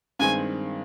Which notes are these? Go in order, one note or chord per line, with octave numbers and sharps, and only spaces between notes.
G2 D#3 G#3 C4 G#5